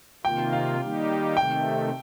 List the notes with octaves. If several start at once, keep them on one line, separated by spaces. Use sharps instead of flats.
C3 D#3 A#3 F4 G5
F5
D#3 G3 A#3 D#4 G4
C3 D#3 A3 G5